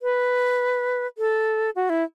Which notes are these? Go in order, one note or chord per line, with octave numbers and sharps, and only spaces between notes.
B4
A4
F#4
E4